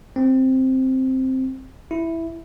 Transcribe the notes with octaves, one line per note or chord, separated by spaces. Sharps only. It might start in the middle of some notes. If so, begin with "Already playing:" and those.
C4
E4